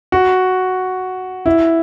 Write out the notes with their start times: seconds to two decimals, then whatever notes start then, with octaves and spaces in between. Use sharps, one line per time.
0.12 F#4
1.46 E4